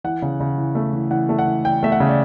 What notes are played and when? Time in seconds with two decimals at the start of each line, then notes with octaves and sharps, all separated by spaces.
0.04 E3 F#5
0.22 C#3
0.40 C#3
0.58 E3
0.75 A3
0.93 E3
1.11 E3 F#5
1.29 A3
1.39 F#5
1.47 E3
1.64 E3 G5
1.83 A3 E5
1.92 F#5
2.00 C#3
2.09 D5